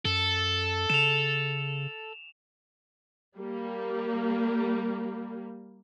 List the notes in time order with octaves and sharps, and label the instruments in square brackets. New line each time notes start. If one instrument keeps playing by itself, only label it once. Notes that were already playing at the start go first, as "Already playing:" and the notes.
[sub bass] F#2 [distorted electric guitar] A4
[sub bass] C#3 [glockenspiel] E7 F7
[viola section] G3 A#3